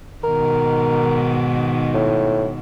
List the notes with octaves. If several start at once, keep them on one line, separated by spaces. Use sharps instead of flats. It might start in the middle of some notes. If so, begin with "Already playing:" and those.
G#2 B2 D#3 A#4
A2